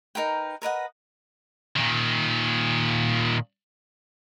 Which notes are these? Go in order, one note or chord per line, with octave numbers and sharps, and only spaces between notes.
D#4 A#4 B4 G5
A#4 B4 D#5 F#5
A#2 D#3